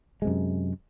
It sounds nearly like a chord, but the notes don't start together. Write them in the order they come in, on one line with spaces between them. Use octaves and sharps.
G#3 C3 F#2